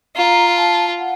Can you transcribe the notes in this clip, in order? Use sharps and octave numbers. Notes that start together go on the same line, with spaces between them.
F4 A#5
A5
F#5